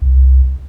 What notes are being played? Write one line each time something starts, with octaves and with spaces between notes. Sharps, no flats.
C2